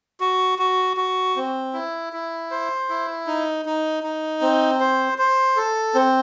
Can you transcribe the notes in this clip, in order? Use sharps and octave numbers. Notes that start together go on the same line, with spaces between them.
F#4
F#4
F#4
C4
E4
E4
C5
E4
D#4
D#4
D#4
C4
C5
C5
A4
C4